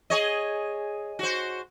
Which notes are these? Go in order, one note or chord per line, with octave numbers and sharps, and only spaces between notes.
G#4 C#5 D#5
F#4 C5